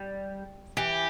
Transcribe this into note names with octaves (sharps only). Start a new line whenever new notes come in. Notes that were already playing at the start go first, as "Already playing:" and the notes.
Already playing: G3
E3 G4